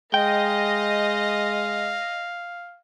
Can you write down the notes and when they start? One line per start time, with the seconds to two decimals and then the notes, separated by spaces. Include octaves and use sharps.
0.14 G#3 D#5 F5 G5